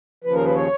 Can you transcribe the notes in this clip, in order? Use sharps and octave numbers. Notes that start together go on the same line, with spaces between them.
D#2 C#3 F3 B4
A#4
B4
C#5